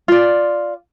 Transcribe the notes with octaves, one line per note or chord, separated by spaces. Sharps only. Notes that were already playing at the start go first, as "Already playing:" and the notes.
F4 D5